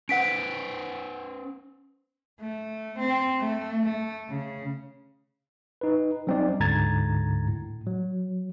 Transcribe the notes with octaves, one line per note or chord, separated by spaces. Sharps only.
C#4 B4 C5 F#5 B6 D7
A3
C4
A3
A3
C#3
D#4 B4
F#3 G3 C4 C#4 D#4 D5
D2 G#2 D3 A#5 G#6 A6
A2
F#3